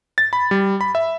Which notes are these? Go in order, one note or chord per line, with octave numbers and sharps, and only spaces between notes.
A6
B5
G3
B5
E5